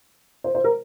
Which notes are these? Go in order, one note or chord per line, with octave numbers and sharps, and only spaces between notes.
C5
C5
A#4